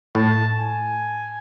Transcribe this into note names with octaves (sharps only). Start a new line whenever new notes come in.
A2 A5
G#5